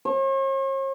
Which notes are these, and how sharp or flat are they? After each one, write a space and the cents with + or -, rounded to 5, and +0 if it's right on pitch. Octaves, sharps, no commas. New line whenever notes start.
C#5 -45